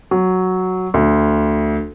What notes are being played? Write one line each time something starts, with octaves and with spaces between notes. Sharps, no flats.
F#3
D2